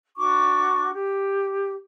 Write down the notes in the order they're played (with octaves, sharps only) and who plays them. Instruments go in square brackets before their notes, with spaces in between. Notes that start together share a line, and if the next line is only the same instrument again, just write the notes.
[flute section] D4 F#4 C#6 D6
G4